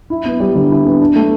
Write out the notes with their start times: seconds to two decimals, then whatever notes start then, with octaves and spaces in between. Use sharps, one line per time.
0.10 E4
0.25 B3
0.40 G3
0.55 D3
0.70 E4
0.85 B3
1.01 D4
1.16 A3